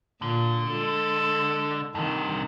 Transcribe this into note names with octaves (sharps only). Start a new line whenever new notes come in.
A#2 D3
G#3 A4
G2 C3 D#3